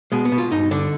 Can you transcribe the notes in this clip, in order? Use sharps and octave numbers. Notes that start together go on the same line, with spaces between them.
B2 G#3
B3
B2
F4
G2 D#4
D3 D4